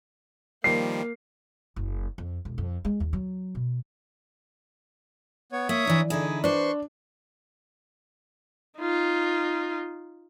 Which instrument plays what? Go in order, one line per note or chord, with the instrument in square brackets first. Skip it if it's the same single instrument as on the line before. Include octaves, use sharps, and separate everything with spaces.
[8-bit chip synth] D#3 F3 G3 [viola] A#3 [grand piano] C7
[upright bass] F#1
F2
E1
F2
G#3
D#2
F#3
B2
[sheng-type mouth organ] B3 C#5
[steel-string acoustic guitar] A#3 [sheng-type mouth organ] C#5 E5 D#6
[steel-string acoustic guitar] E3 D4 D#4
[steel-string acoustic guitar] D3 D#4 E4 [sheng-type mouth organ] G#4
[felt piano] D4 [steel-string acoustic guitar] B4 C5 [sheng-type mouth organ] C6 C#6
[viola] D#4 F4